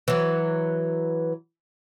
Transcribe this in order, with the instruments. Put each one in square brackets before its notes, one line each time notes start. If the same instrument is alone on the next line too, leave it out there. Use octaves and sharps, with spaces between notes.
[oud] E3 F#3